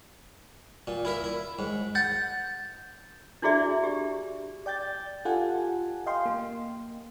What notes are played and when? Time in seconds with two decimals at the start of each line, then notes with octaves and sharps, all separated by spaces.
0.87 A#2
1.05 E4 A#4 E5
1.24 E4
1.59 G#2
1.95 F#5 G6 A6
3.42 D4 E4 F#4 G#4 D5 E5
3.84 G4
4.66 D5 G5 G6 A6
5.25 F4 G4 A4 F#5 G#5
6.06 D#5 F5 G5 C6
6.26 A#3